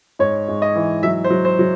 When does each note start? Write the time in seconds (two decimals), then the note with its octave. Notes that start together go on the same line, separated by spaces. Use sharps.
0.19 G#2 C#5
0.48 G#2
0.62 D#5
0.76 E3
1.03 F#3 E5
1.24 C5
1.30 F#3
1.45 C5
1.59 F#3